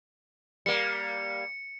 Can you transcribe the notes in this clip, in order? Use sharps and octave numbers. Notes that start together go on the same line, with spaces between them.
G3 A#3 C#7